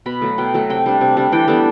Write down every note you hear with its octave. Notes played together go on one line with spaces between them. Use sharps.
B2 B5
F#3 A3
B2 G5
F#3 A3
C3 G5
G3 D4
C3
G3 D4
E3 G5
G3 B3 D4 A4